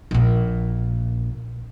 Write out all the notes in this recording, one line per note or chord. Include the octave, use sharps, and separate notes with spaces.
A#1 A#2